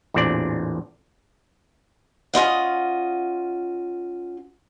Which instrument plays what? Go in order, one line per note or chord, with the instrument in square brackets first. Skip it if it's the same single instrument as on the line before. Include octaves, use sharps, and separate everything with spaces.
[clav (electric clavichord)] A1 E2 A#2 C4 D4 D5
[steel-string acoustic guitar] C#4 F4 D#5 F#5